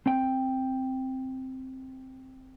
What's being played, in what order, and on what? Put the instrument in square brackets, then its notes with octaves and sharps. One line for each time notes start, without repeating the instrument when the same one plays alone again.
[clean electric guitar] C4 G5